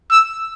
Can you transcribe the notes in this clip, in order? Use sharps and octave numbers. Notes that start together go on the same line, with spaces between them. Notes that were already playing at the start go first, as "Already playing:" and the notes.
E6